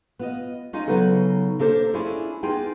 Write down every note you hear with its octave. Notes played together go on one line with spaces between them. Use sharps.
B3 F4 D#5
C#4 D#4 F4 D5 D#5
C#3 E3 F#3 B3 D#4 A4
A#3 D4 A4 C5
C#4 D4 E4 F4 G#4 D5
B3 D#4 F4 G#4 G5